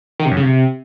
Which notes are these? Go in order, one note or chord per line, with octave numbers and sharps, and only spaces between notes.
D#3
C3
F#2
C#3
C3